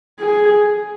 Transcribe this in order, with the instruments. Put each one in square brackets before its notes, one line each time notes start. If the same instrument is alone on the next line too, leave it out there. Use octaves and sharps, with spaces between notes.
[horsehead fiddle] G#4